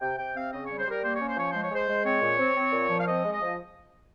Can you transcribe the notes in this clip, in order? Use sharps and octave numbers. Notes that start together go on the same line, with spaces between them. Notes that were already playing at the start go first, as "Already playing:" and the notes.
C3 G5
C3 G5
C4 F5
C#3 D#5
C#5
G3
C5
G3 A#4
A#3 C5
C#5
C#4
C5
F3 C#5
G#3 C5
C#5
G#3 C5
G#3
C4 C#5
A#2
C4
C4
A#2
F3
F5
C4 D#5
G#3
D#5
F3